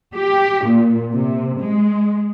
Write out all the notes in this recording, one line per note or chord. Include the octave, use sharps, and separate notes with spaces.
G4
A#2
C3
G#3